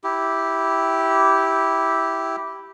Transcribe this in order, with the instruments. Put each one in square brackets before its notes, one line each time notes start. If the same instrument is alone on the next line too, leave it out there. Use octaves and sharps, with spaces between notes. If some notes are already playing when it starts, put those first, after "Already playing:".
[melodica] E4 G4